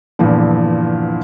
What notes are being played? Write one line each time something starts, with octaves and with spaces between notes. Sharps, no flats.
E2 G2 A#2 D3 E3 F3